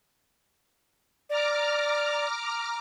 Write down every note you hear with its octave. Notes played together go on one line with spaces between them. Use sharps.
D5 A#5 D6 F6